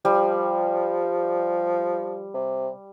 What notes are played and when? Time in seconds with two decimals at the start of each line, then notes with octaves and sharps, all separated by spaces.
0.05 F3 G3
2.34 C3